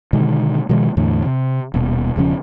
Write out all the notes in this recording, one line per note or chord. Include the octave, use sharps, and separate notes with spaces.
B2 D3 D#3 G#3
B2 D#3 F3 G#3
E2 A2 D3
C3
D#1 B2
E1 C#3 F3 C#4